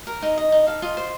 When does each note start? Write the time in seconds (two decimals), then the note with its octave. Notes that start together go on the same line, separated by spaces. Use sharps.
0.07 A#4
0.22 D#4
0.38 D#5
0.52 D#4
0.67 A4 F5
0.82 F4 D#5
0.97 C5